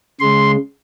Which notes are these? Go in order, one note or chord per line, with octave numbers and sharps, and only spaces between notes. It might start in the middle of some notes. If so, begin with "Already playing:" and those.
C#3 G#3 C6